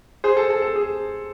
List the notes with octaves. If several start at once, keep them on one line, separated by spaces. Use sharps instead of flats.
G#4 C5
A4
A4
A4
G#4